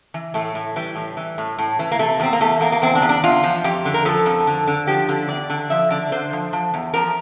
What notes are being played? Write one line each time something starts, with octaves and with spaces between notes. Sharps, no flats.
E3
A2 A3
A2
E3 G3
A2
E3
A2
A2
E3
A#3
C3 A3
E2 C4
A#3
E2 A3
E2 A#3
A#3
E2 C4
D4
E2
D4
E2 F4
F3
F2 G4
D3
A#4
F3 A4
F2
D3
D3
F3 G4
D3
E2 D5
D3
F3 E5
D3 D5
D3 C5
F3
F3
E2
F3 A#4